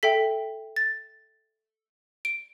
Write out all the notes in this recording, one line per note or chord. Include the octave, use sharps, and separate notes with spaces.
A4 E5 G5 B6
A6
D7